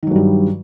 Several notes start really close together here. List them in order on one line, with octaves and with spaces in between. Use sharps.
D#3 F#3 G2 G3